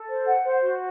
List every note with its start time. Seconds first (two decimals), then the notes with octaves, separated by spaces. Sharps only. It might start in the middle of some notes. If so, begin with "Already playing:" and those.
Already playing: A4
0.09 C5
0.26 F#5
0.45 C5
0.63 F#4